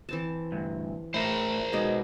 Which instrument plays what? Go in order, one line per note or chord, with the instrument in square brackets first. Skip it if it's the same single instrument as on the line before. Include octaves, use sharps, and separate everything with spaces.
[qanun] E3 C4 A5
[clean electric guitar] D2 G2
[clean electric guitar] A2 E4 [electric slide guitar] A#4 C5
[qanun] B2 D#4 D5 [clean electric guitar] G#3